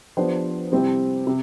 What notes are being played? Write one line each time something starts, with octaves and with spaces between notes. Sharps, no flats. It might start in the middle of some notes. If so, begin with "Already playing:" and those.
F3 B3 D4 G4 C5
C3 G3 C4 E4 G4
C3